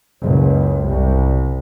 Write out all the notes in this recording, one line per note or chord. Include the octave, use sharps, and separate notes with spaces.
F#1 C#2
C2